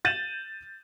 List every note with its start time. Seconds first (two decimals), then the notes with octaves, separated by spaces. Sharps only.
0.05 G6 A6 D#7 E7 F#7